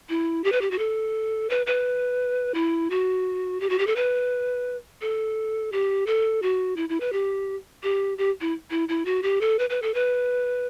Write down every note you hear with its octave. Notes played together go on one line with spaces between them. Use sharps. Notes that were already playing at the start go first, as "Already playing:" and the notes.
E4
G4
B4
G4
F#4
A4
B4
B4
E4
F#4
G4
F#4
G4
A4
B4
A4
G4
A4
F#4
E4
E4
B4
G4
G4
G4
E4
E4
E4
F#4
G4
A4
B4
B4
A4
B4